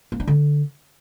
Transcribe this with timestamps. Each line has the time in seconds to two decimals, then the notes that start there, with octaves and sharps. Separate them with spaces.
0.12 A#3
0.20 D4
0.28 D3